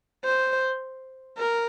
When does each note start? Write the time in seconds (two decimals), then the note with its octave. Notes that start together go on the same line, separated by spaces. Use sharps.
0.25 C5
1.38 A#4